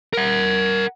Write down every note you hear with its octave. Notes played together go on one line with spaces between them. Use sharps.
A#4 F#5